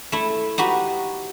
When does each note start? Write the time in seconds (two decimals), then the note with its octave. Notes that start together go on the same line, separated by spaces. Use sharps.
0.12 A3 E4
0.58 D#4 F#4 G4 B4